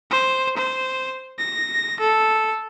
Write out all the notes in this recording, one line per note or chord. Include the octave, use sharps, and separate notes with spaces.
C5
C5
A#6
A4